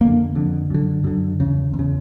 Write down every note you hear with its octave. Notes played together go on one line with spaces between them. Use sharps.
F2 D3 A#3
F2 D3
F#2 D3
F#2 D3
E2 C#3
E2
C#3